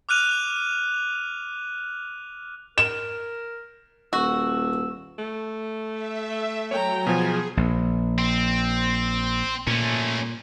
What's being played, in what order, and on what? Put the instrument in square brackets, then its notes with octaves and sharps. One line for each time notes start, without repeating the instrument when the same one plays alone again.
[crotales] D6 F6 F#6 D#7 F7
[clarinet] A#4 [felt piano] E7
[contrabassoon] D#1 [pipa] F#4 [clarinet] E6
[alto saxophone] A3
[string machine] E5
[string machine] F#3 [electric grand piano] C#5 [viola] G5 A#5
[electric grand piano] B2 F3 [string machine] G#4 [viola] G#5
[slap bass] A#1
[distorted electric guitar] C4
[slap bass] A#2 [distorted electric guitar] A3 C#4